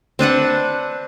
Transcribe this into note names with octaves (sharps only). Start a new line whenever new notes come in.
C4 D4 B4 F#5